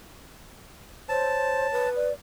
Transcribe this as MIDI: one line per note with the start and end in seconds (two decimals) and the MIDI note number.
1.09 1.67 72
1.09 1.88 73
1.09 1.89 81
1.72 2.09 71
1.96 2.13 74